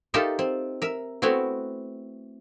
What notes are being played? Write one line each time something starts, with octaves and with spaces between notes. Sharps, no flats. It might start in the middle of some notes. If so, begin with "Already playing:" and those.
D#4 F4 G4 A4 A#4 E5
C4
A#4 E5
A3 B3 C4 E4 F#4